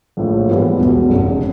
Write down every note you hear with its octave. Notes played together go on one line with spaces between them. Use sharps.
A#1 A2 F3
G#2 E3 G3 B3 E4
E1 E2 B2
F1 F2 C#3